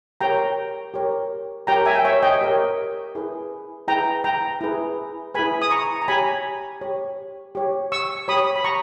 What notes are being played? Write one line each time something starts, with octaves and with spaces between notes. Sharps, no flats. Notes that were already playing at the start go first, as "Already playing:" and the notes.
G4 A#4 C#5 G5 A#5
G4 A#4 C#5
G4 A#4 C#5 G5 A#5
E5 G#5
G5
C#5 E5
D#5 G5
G4 A#4 C#5
E4 G#4 B4
E4 G#4 B4 G5 A#5
G5 A#5
E4 G#4 B4
E4 G#4 B4 G#5 B5
D#6
A#5 C#6
A#5
G4 C#5 G#5 B5
G4 C#5
G4 C#5
C#6 E6
G4 C#5 B5 D#6
B5
A#5 C#6